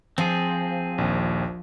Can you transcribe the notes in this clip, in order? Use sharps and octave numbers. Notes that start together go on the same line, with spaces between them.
F3 C4 G#4
A#1 D#2